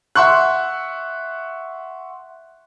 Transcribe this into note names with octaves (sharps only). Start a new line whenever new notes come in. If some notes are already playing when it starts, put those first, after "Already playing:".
E5 F#5 C6 C#6 F#6